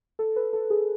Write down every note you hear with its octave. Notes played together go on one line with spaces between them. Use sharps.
A4
B4
A4
G#4